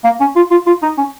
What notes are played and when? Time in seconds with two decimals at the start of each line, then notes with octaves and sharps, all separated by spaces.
0.04 A#3
0.20 C#4
0.36 F4
0.51 F4
0.67 F4
0.83 D#4
0.98 C#4